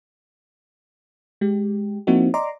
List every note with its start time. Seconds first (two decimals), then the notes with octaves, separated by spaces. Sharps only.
1.41 G#3 G4
2.07 F3 A#3 C4 D#4 E4 F#4
2.34 D5 D#5 A#5 C6 D6